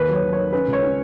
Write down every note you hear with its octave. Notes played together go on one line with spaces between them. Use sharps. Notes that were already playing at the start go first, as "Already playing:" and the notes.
Already playing: D#2 A#3 B4
F#3 C#5
F#3
C#5
D#3
C#4 B4
C#2
C#5
C#4